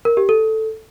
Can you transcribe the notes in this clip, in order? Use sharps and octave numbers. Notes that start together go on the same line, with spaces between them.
A#4
G4
A4